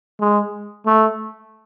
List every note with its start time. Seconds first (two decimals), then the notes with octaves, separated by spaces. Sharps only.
0.20 G#3
0.86 A3